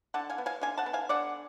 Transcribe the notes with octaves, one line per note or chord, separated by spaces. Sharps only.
D3 F#5 A5
F5 G#5
B3
F5 G#5
D3 F5 G#5
F#5 A5
B3
F5 G#5
D3 D5 F#5